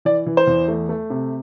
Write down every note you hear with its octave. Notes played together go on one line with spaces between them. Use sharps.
E3 D5
E3
C5
E2
A3
A3
C3